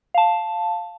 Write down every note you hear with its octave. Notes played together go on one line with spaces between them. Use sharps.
F5 A5